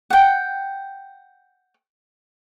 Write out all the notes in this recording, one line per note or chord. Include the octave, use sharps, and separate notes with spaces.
F#5 G5